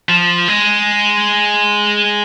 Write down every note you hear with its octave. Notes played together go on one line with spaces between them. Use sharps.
F3
G#3